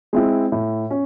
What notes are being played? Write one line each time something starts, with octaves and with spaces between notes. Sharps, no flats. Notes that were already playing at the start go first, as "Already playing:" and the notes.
G#3 C4 E4
A2
C#4